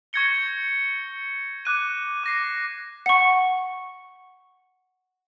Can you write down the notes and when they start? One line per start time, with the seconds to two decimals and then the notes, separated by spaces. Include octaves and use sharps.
0.13 C#6 G6 G#6 A#6 C#7 G7
1.65 D6 F#6 D#7
2.24 D6 A#6 C7
3.06 F#5 C#6